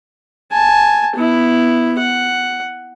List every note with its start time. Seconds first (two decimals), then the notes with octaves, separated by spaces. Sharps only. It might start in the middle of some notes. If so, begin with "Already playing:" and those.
0.52 G#5 A5
1.16 B3 E4
1.99 F#5